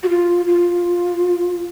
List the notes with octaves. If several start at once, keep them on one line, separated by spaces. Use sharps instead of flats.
F#4
F4
F4